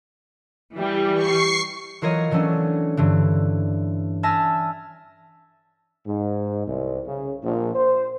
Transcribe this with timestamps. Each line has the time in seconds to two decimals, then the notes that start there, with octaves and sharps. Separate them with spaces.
0.74 E3 G3
1.15 C#6 C7
2.02 E3 F#3 F4 A#4 C#5 D#5
2.31 E3 F#3 A3 C#4 D4
2.97 G2 D3 E3
4.23 E5 G#5 A5 E6 F6 A#6
6.06 G#2
6.67 C2
7.06 C#3
7.43 A#1
7.74 C5